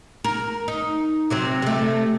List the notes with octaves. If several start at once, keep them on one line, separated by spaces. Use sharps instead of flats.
A#4
D#4
C3 F#3 C4
C3 A3